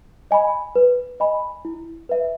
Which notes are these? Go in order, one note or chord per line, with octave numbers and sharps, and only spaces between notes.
D#5 G#5 B5
B4
D#5 G#5 B5
E4
B4 E5